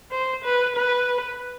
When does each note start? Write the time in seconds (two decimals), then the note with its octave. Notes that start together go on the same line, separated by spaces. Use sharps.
0.11 C5
0.44 B4
0.76 B4